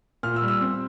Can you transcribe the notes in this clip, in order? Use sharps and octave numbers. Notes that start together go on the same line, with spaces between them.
A#2 F6
E6
G3
E6
C4